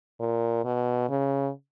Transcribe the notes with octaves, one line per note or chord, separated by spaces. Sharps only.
A#2
B2
C#3